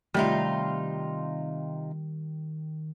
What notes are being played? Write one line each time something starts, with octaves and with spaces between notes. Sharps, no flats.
C3 D#3 G3 A3 D#4 F4 E5